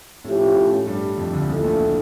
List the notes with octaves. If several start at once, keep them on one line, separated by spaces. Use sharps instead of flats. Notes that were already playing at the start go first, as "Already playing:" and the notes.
A2 F3 A3 C#4 E4 G4
A2 A3
G2 G3
F2 F3
D2 D3
C#2 C#3 F3 A3 E4 A4
A#1 A#2